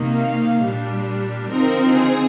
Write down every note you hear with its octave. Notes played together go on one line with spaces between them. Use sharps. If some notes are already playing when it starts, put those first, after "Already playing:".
Already playing: C3 D#3 A#3 D#4
F5
A#2 G3 D4
D3 F3 C4 D#4 A#4
G#4